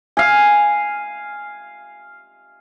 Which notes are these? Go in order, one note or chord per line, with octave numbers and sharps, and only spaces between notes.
F5 G#5